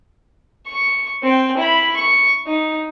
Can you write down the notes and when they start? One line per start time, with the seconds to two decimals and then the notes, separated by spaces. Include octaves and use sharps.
0.66 C#6
1.23 C4 G5
1.57 E4 B5
1.97 C#6
2.47 D#4